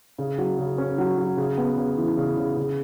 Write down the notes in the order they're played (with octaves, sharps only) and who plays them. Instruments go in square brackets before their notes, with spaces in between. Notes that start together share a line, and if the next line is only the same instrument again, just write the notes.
[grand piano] C#3
F#3
C#3
C#4
F#3
F#3
C#3
B3
C#3
E3
C#3
C#3
C#3